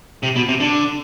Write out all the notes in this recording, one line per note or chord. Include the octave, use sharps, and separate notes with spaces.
C3
B2
C3
D3